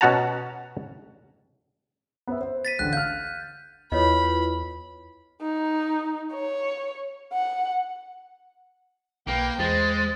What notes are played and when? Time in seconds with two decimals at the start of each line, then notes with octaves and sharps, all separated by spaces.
0.01 B2 C#4 F#4 F#5 A5 A#5
2.28 B3 C5 E5
2.41 C5
2.65 A6 B6 D#7
2.79 A1 D3 F#6
2.93 F5 F6 G6
3.92 E2 E4 F4 A4 B4 C#5 D#5 B5
5.41 D#4
6.33 C#5
7.33 F#5
9.27 B1 A#3 B4 G5
9.59 E2 G#3 C5 A6